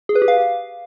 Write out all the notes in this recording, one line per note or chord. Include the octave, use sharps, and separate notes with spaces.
G#4
B4
G4
F5